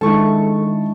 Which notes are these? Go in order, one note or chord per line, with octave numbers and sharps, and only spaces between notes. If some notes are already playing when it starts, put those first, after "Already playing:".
D#3 G#3 D4 E4 A4 A5 C#6